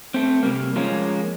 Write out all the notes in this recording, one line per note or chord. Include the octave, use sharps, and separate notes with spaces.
A3 C4
C3 G3 A#3
F3 G#3 A#3 C#4